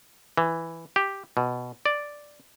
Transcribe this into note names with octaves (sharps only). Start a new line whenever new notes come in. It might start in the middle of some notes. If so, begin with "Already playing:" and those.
E3
G4
B2
D5